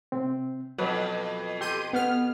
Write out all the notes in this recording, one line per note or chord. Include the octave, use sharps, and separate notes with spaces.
C3 C4
F2 B2 F#3 B4
G4 A4 C6 G6 D#7
B3 F6